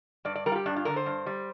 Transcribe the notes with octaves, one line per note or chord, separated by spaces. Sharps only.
G2 D5
D5
G3 A#4
F4
G4
G2 D4
F4
D3 A#4
C5
G2
G3